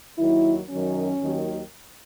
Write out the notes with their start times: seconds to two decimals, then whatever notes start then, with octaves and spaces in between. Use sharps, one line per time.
0.18 D#2 D#3 F#3 E4
0.70 F#2 D#3 F#3 C#4
1.21 D#2 D#3 F#3